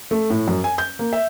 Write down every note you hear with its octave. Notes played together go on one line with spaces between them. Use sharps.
A3
A2
F#2
G#5
G6
A#3
E5